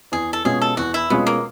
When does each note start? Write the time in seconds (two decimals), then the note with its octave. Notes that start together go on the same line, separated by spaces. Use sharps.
0.12 E2 G#4
0.33 A4
0.45 B2 G#3 C#4 F4 G#4
0.62 A4
0.77 E2 F#4
0.94 E4
1.10 B2 G#3 B3 C#4 F4
1.27 A#3